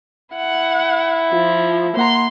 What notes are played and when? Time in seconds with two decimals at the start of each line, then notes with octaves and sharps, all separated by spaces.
0.36 E4 F#5
1.33 F3 F4
1.97 A#3 F#5 A#5 C6